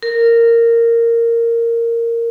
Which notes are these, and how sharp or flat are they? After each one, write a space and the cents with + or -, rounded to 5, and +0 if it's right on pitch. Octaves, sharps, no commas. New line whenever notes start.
A#4 -10